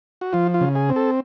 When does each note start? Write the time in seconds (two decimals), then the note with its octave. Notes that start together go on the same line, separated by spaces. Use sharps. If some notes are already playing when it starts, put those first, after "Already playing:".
0.21 F#4
0.33 F3 F4
0.54 F4
0.61 C#3
0.75 G#4
0.89 C4
0.96 A4